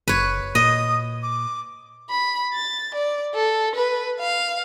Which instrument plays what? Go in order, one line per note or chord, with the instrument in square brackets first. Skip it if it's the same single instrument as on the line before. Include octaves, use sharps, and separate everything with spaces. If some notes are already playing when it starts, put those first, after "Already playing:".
[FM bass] F#1 [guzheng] B4 C#5
[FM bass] A#2 [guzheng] D#5 [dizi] D#6
[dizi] D6
[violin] B5
A6
D5
A4
B4
F5